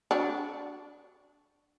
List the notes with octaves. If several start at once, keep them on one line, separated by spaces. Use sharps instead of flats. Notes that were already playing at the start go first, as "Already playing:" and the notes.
D4 F#4